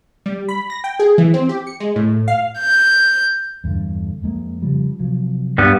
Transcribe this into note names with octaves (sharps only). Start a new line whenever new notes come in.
G3
B5
A#6
G5
G#4
E3
C4
G4
C#7
G#3
A2
F5
G6
E2 G2 D3
F2 G#3 A#3
C#3 F3 G3
C3 F3 F#3
G2 G3 B3